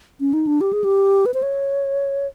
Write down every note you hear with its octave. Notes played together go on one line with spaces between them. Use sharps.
C#4
D#4
D4
G4
G#4
G4
B4
C5
C#5